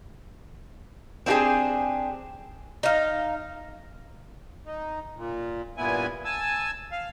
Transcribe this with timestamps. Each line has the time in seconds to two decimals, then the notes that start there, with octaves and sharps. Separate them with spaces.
1.26 C4 D4 D#4 F4 G4 G#4
2.83 D#4 F5
4.66 D#4
5.16 A#2
5.78 G2 A#2 B3 E4 G#5
6.25 G#5 A5 E6
6.92 F5